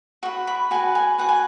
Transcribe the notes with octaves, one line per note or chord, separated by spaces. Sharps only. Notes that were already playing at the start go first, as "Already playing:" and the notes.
F#4 B4 C#6
B5
F#4 B4 G#5
G#5
F#4 B4 F#5
G#5